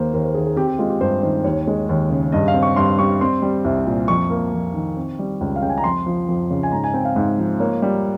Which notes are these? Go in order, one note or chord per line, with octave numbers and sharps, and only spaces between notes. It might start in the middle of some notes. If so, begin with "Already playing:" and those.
Already playing: D#2 A#3 C5
D#2 A#4
C5
D#3 G#4
G#4
C4 G4
G4
G#3 F4
G4
G2 C5
D#3 C5
D#2 C#5
G#3
D#2
C#3
G2 D#5
F5
C4
C#6
G2 C6
G3 C#6
C4 C6
G3
C2
A#2
F2 C#6
A#3
F2
D#3
C4
G3
C#2
F5
C#3 G5
G#5
A#5
F2 C6
F3
F2
C#3
G#5
G#2 A#5
G#5
C4 G5
F5
G#2
F3
A#3 C#5
G3